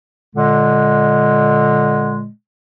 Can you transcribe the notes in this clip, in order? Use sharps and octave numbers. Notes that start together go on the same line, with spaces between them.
A#2 D3 G#3